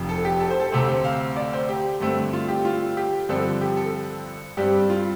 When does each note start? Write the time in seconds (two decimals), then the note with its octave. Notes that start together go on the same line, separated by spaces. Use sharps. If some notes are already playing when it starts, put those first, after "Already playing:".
Already playing: F1 F2 F3 C4
0.09 A4
0.25 G4
0.40 A4
0.50 C5
0.60 A4
0.72 D2 C3 A3 C4 C5
0.88 C5
1.05 F5
1.36 D5
1.53 C5
1.69 G4
2.00 G2 D3 A3 C4
2.33 F4
2.48 G4
2.65 F4
2.97 G4
3.29 G2 D3 F3 C4 A4
3.61 G4
3.77 A4
4.57 G2 G3 C4 G4
4.90 F4